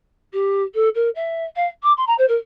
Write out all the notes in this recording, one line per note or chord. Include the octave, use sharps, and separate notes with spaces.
G4
A4
A#4
E5
F5
D6
C6
A#5
C5
A#4